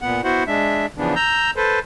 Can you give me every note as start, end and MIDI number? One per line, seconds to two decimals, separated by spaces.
0.02 0.22 46
0.02 0.22 59
0.02 0.22 78
0.24 0.44 59
0.24 0.44 64
0.24 0.44 66
0.24 0.44 72
0.24 0.44 78
0.47 0.86 56
0.47 0.86 62
0.47 0.86 76
0.98 1.15 49
0.98 1.15 52
0.98 1.15 53
0.98 1.15 59
0.98 1.15 62
1.16 1.51 82
1.16 1.51 88
1.16 1.51 91
1.56 1.80 69
1.56 1.80 71
1.56 1.80 72